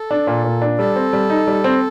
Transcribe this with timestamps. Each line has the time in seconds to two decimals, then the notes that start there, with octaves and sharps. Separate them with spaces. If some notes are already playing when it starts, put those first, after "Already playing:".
Already playing: A4
0.11 D4
0.27 A#2
0.44 A#2
0.62 D4
0.78 G3 A4
0.96 C4
1.13 G3
1.30 D#4
1.47 G3
1.64 C4